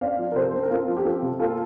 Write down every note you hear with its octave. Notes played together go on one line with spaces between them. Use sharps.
C4 D5 F5
F3
A#4
C3 A4 C5
C4
A#4
C4 F4 A4
F3
G4
C4 F4 A4
C3
A#3 F4 A4